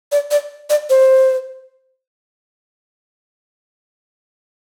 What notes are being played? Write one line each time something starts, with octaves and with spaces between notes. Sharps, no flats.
D5
D5
D5
C5